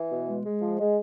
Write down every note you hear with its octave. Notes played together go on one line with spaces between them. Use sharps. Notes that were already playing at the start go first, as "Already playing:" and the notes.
Already playing: E3
B2
G#3
G#3
F3
G#3